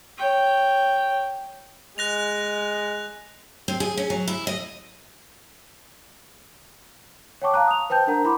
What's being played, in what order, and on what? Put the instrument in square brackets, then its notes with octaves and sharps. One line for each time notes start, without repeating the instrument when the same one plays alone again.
[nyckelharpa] C#5 G5
[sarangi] G#3 [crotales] F#6 A#6 F7
[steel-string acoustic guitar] C4
G#4
C#4
F#3
E4
D#5
[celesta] C#5 F#5 G5 A5 C#6 D6
F5 A5 A#5 F#6
D#6 F7
B4 C5 G5 A5 G6
D4 A#4 F#5 A#5
E4 B5 C6 D6